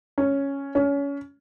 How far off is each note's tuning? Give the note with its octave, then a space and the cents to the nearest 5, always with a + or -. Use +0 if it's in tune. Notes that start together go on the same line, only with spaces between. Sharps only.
C#4 +0
C#4 +25